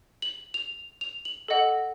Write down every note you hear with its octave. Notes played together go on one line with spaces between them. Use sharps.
F#7
F7
F7
F#7
A4 D#5 F#5